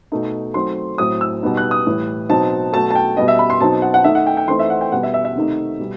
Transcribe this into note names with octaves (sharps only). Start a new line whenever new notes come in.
B2 A3 D#4
D#3 F#3 A3 C4 C6
A2 F#3 C4 D#6
E6
B2 G3 B3 D#4
F#6
D#6
A2 E3 G3
B2 F#3 C4 D#4 A5
B2 F#3 A3 A5
A5
G5
B2 G3 B3 D#5
E5
B5
C6
B2 F#3 C4 D#4 A5
F#5
F#5
D#3 A3 D#4 E5
F#5
G5
G5
E3 A3 C4 D#4 C6
E5
F#5
G5
B2 G3 B3 F#5
E5
E5
E5
C3 D#3 A3 D#4
B2 G3